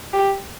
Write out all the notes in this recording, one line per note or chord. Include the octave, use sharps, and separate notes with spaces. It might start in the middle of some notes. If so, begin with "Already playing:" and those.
G4